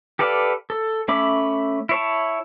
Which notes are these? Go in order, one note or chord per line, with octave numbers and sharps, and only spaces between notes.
G4 A4 B4 D5 F5
A4
A3 C#4 E5 B5 D6
E4 C#5 A5